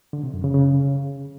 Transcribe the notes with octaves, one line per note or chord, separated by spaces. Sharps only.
D3
C3
F#2
C#3
C#3